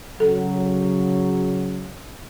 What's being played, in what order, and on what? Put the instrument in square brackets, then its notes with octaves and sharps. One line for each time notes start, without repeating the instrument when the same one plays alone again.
[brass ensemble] C#3 F#3 [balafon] A4